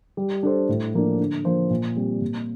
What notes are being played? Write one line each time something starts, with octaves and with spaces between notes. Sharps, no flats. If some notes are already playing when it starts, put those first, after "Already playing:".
G3
D4 A4 C5
A2
F3 A#3 D4
D3
F3 A#3 F4 C5
A#2
G3 C4
A#2